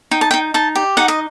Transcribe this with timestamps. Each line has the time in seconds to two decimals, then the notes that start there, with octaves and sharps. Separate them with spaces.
0.11 D#4 G5
0.21 A5
0.31 G5
0.34 D#4
0.54 D#4 A5
0.75 G4
0.97 D#4 F#5
1.08 D#5